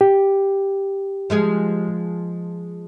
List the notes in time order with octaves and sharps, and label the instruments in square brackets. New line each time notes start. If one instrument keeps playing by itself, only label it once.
[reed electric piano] G4
[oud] F3 G#3 G#4